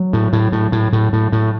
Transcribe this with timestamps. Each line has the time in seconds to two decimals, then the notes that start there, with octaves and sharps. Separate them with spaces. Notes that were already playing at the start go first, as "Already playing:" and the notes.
Already playing: F#3
0.13 A2
0.33 A2
0.52 A2
0.72 A2
0.93 A2
1.13 A2
1.32 A2